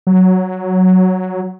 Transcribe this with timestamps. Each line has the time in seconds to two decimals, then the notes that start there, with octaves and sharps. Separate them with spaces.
0.07 F#3